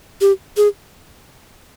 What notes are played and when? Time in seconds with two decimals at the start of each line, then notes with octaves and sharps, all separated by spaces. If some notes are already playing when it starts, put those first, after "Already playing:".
0.21 G4
0.57 G#4